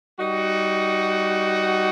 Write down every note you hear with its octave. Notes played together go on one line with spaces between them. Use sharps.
G3 D#4 F#4